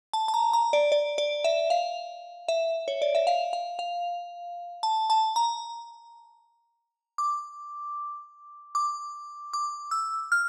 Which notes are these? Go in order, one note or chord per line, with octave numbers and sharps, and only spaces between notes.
A5
A5
A#5
A#5
D5
D5
D5
E5
F5
E5
C#5
D5
E5
F5
F5
F5
A5
A5
A#5
D6
D6
D6
E6
F6